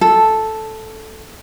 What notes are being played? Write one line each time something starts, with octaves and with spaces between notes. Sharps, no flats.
A4